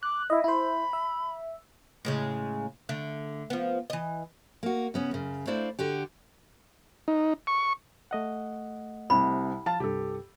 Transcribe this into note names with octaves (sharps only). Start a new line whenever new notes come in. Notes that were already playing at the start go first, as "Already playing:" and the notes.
D6 F#6
E4 D#5 E5
E4 C5 B5
E5
A2 C#3 G#3
D3 A3
F3 B3
E3 D#5
A#3 F#4
C#3 B3 C#4
F#2 C#3
A3 D4 E4 C5 D5 F5
D3 F#4 G4
D#4
C#6
A3 D#5 F#5
C2 C3 B5
F3 F5 A5 A6
C2 G2 G4 A4